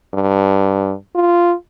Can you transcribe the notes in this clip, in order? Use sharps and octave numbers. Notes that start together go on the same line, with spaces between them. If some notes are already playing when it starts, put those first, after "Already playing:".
G2
F4